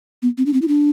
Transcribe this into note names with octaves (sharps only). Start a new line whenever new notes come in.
B3
C4
D4
C4
E4
D4